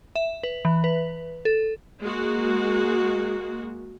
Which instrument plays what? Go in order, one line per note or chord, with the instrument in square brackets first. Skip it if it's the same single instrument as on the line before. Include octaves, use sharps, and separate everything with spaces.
[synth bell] E5
B4
E3
B4
A4
[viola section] G#3 A#3 F#4